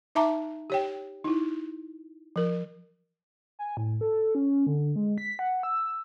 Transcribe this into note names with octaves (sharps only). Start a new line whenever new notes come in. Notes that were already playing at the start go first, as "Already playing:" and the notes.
D#4 E5 A5 A#5 D6
G4 C#5 G5
D#4 E4
F3 A#4
G#5
A2
A4
C#4
D3
G#3
B6
F#5
E6